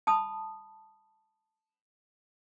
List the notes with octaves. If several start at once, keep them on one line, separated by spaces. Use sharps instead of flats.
A5 B5 D#6